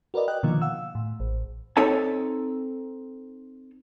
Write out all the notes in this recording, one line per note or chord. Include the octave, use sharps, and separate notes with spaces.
F#4 A#4 B4 D5 D#5
D#5 G5 F#6
B2 D3 D#3 F3 A#3 F4
F5 F#5 E6
A2
A1
C4 D#4 A4 C#5 A5